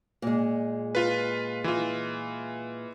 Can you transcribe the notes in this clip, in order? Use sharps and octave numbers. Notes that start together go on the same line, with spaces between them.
A#2 G#3
F4 B4
E3 F4